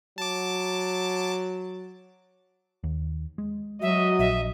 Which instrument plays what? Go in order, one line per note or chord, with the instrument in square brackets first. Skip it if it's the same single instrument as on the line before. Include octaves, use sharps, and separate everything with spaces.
[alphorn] F#3 [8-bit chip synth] A5 D6
[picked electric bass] D#2
G#3
[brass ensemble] F#3 [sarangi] D#5 [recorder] E5
[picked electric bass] A#1 [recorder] E5